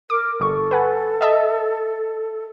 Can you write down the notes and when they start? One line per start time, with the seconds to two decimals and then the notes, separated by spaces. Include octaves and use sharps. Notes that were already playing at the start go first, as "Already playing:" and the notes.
0.10 A#4 D6
0.40 G1 A4 C#6
0.71 B4 F#5 G#5
1.21 D#5 E5 A5